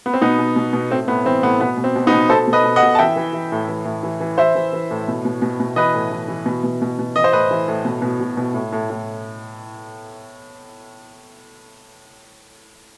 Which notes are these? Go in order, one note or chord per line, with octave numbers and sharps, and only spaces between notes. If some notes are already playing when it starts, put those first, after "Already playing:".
B3
C4
B2 B3 D#4
B2
B2
B2
A2 C4
A2 B3
E3 C4
A2 B3
B2 B3
B2
C4
B2
B3 D#4
B2
B2 A4 C5
B2
B4 D#5
B2
D#5 F#5
B2
A5
E3 E5 G5
E3
E3
A2
E3
A2
E3
E3
E3 C5 E5
E3
E3
A2
B2
B2
B2
B2
E3 B4 D#5
A2
E3
E3
B2
B2
B2
B2
E3 D#5
C5
A2 B4 D#5
E3
A2
B2
B2
B2
B2
A2
A2
A2